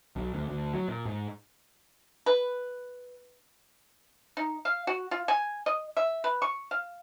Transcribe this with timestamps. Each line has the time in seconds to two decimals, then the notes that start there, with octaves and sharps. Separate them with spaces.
0.16 B1
0.34 D2
0.49 D2
0.74 F#3
0.88 A#2
1.05 G#2
2.26 B4
4.37 D#4
4.65 F5
4.87 F#4
5.11 F4
5.28 G#5
5.66 D#5
5.97 E5
6.24 B4
6.42 C#6
6.71 F5